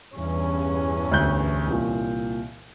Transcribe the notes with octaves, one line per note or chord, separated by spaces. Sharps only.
E2 G2 C#4
D2 F#6 G6
C2 A#2